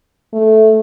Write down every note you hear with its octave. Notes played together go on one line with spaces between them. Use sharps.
A3